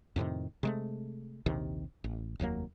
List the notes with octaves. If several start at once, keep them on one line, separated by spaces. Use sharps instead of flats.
F2 A2 C3 D#3
C3 G#3 A3
A#1 D#2 C3 D#3
A1
F1 D#2 F#3 A#3